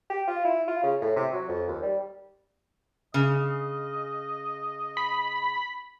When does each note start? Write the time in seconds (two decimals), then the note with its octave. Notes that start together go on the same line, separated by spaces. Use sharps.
0.09 G4
0.27 F4
0.45 E4
0.68 F4
0.83 C#3
1.01 A2
1.16 C3
1.32 F#3
1.48 F2
1.68 D#2
1.82 G3
3.14 C#3 D#5
4.97 B5